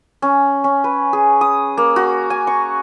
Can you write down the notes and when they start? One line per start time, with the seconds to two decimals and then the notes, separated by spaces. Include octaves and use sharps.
0.22 C#4
0.64 C#4
0.84 B4
1.13 G#4
1.41 D#6
1.77 A#3
1.96 F#4
2.30 G#5
2.47 C#6